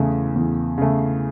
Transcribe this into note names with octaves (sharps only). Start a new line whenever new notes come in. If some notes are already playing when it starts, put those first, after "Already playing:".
Already playing: E2 C#3 A3
E2
C#3 A3